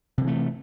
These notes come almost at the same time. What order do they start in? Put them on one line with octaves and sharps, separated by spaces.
C3 F3 E3 A3